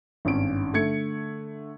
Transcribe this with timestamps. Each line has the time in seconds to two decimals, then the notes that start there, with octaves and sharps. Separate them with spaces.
0.25 G#1 G2 C#4 D4 D7
0.73 D3 A3 G#6 C#7